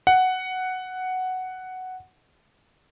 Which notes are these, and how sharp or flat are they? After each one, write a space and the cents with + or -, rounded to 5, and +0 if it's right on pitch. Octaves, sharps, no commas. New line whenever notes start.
F#5 +5